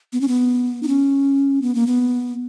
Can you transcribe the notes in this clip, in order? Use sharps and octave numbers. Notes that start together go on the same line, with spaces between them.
B3
C#4
B3
D#4
C#4
B3
A#3
B3